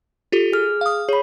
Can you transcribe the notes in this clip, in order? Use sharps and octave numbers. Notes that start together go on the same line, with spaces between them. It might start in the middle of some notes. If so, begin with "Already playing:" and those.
F4 G4 A4
G#4 F6
F5 D#6
G#4 C#5 B5